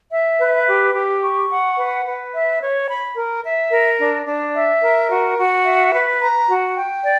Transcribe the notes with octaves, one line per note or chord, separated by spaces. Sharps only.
E5
B4
G4
G4
C#6
F#5
B4
B4
E5
C#5
B5
A#4
E5
A#4
D4
D4
E5
A#4
F#4
F#4
E5
B4
A#5
F#4
G5
D5